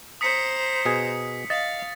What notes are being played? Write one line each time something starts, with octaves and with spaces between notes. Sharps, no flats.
C5 A#5 D#6 B6 C#7
B2 G#4
D#5 F5 A6